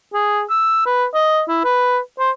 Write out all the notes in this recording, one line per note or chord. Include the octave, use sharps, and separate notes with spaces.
G#4
E6
B4
D#5
E4
B4
C5